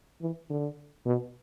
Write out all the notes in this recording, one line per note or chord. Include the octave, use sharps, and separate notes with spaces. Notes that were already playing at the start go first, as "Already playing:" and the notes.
E3
D3
B2